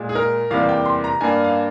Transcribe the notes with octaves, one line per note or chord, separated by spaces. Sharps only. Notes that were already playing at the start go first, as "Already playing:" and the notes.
Already playing: A#2 G#3
G#4
A#4
E2 C3 G3 A#3 F5
G5
C6
A#5
G2 G3 A#3 G#5
F5